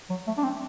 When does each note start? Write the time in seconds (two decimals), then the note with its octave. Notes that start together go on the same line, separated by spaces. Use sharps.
0.10 F#3
0.27 A3
0.38 D4
0.44 C4